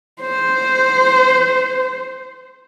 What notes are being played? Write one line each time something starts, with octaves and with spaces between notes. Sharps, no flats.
C5